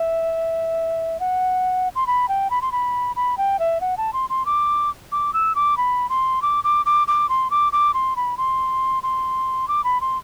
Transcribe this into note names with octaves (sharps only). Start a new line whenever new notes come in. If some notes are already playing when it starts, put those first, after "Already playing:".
Already playing: E5
F#5
C6
B5
G5
B5
C6
B5
B5
G5
E5
F#5
A5
C6
C6
D6
D6
E6
D6
B5
C6
D6
D6
D6
D6
C6
D6
D6
C6
B5
C6
C6
D6
B5
C6